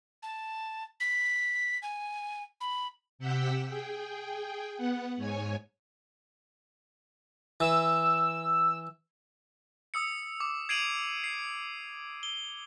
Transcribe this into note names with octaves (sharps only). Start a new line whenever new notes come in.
A5
B6
G#5
B5
C3 G4 F#5 G5 E6 B6
G#4 G5
B3 F#5
G#2 C#5 G#5
E3 E6
D#6 E6 C#7
D6
G#6 C7 D7 D#7 F7 F#7
C7
G7